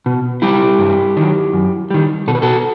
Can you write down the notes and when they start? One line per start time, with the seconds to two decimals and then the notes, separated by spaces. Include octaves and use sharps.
0.06 B2
0.42 G3 E4 G4
0.79 G2
1.17 D#3 F#3
1.53 F#2
1.90 D#3 G3
2.28 B2 A4
2.35 B4
2.42 F#4 A4